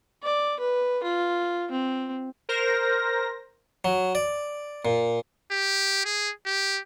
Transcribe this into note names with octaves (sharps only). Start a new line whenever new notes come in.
D5
B4
F4
C4
A#4 C5 A#6
F#3
D5
A#2
G4
G#4
G4